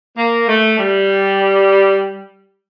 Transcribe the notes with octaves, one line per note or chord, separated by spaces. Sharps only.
A#3
A3
G3